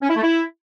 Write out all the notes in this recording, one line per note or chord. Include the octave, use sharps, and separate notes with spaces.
C#4
E4
A3
E4